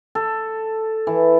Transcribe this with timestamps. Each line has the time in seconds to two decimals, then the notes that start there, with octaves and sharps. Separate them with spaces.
0.15 A4
1.07 E3